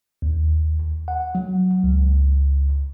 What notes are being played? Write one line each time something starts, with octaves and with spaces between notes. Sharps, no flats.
D#2
F#5
F#3
C#2